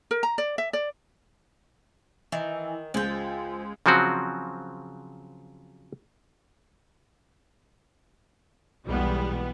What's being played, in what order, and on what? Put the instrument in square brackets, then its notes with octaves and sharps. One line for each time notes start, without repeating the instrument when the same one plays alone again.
[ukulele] A#4
A#5
D5
E5
D5
[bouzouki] D#3 [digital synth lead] E3
[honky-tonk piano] C#2 [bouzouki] F3 G5 [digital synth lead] G#3
[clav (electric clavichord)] C#3 F3 F#3 C4 F#4
[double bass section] B1 E2 G#3 [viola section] G3 B3